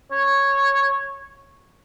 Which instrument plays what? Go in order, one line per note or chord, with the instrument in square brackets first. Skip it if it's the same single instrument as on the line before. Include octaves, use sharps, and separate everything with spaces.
[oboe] C#5